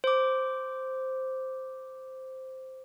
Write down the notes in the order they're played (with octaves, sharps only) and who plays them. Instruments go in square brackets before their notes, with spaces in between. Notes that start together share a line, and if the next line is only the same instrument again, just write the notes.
[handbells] C5 D6